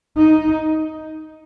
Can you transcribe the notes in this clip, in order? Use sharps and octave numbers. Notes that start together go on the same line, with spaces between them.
D#4